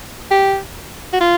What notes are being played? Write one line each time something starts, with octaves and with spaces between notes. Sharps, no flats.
G4
F#4
F4